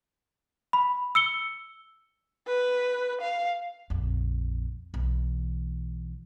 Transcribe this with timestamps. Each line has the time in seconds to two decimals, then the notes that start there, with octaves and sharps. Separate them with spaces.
0.73 B5
1.15 E6 C#7 G7
2.47 B4
3.21 F5
3.90 A#1 F2
4.94 B1 E3